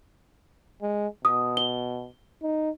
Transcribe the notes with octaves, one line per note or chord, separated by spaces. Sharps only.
G#3
B2 D#6
G7
D#4